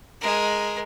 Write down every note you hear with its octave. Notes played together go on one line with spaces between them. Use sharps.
G#3 A#4